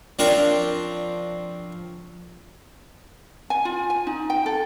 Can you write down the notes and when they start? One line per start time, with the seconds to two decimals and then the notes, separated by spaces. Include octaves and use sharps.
0.19 F3 C4 D4 A#4 C#5 A#5
3.50 G#5
3.65 F4
3.90 G#5
4.07 D#4
4.30 G5
4.46 A4